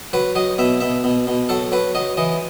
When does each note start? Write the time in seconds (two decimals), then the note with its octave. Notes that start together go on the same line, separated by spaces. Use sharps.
0.13 F#3 B4
0.35 F#3 D#5
0.58 B2 E5
0.81 B2 E5
1.04 B2
1.27 B2
1.49 F#3 A4
1.72 F#3 B4
1.95 F#3 D#5
2.17 E3 D#5